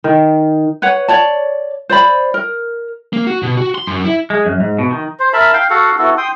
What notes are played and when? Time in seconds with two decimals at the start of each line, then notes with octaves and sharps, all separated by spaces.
0.04 D#3
0.82 B4 C#5 F#5
1.08 C#5 D5 A5
1.89 C5 D5 B5
2.34 A#4
3.13 A#3
3.27 F#4
3.43 B2
3.57 F#4
3.75 C6
3.87 F#2
4.05 E4
4.30 G#3
4.46 F#2
4.60 G#2
4.78 B2
4.91 D#3
5.20 C5
5.33 A#4 E5 A5 B5
5.53 F5 G5
5.70 F#4 A4 F5 F#5
5.98 B3 E4 F#4 A4
6.17 G5 C6 D#6